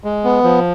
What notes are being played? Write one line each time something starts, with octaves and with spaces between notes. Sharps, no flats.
G#3
B3
F3